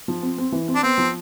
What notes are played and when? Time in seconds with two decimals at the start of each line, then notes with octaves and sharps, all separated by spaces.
0.08 F3
0.23 C4
0.38 C4
0.52 E3
0.68 C4
0.75 D4
0.83 B3 C4
0.98 F3